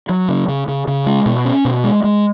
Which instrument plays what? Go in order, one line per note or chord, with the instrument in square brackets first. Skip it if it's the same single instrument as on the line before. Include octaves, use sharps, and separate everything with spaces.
[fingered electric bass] F#3
C#3
C#3
C#3
C#3
G#3
B2
C#4
B2
G#3
G#3